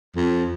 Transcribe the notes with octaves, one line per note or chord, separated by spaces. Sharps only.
F2